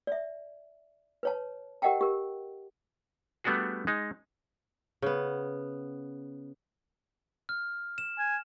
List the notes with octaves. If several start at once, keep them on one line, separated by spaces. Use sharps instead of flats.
D5 E5
B4 C#5 A5
G4 A#4 D#5 F#5 G5 A5
G4 A#4
G3 A3 B3 D4 F#4 G#4
G#3 D#4
C#3 B3
F6
E7
G#5